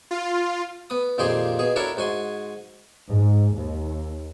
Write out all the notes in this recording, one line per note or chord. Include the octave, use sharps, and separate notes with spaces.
F4
B3 D#6
F2 A#2 D#3 G4 G#4 C6
B2 G#4
D4 E4 F#4 A4 A#4 C#5
G#2 F#4 G#5 C6
G#2
D#2